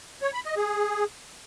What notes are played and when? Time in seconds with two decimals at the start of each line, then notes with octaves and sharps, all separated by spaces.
0.22 C#5
0.33 B5
0.45 D#5
0.57 G#4